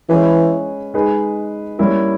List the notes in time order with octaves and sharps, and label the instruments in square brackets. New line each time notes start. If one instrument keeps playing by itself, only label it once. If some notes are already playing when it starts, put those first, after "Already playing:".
[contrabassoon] E3 [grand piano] G#3 C#4 G#4 B4
[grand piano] G#3 D#4 G#4 B4
G3 A#3 C#4 E4 A#4